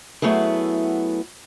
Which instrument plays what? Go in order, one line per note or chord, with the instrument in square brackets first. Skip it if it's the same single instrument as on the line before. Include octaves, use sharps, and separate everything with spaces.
[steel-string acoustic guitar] F#3 A3 B3 E4 G#4